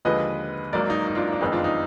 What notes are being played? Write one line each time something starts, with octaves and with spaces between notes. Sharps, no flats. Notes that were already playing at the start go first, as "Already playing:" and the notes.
D#2 D3 F3 G#3 B4 D#5
G#1 G#2 F#3 A#3 A#4 D5
D#4
D#4
D4 F4
D4
F#1 F2 D#3 G#3 B3 D#4
D4 F4
D#4